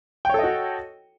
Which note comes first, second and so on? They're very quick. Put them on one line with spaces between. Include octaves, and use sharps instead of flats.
G5 C#5 A4 D#5 F#4